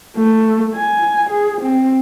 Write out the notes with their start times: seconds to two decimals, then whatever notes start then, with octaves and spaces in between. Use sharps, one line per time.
0.17 A3
0.76 G#5
1.29 G#4
1.61 C4